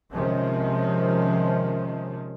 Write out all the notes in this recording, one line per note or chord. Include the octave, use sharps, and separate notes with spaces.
C3 D#3 F3 G#3 C4 C#4